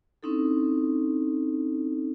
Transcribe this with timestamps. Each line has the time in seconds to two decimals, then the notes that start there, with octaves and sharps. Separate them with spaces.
0.23 C4 C#4 D#4 E4 A4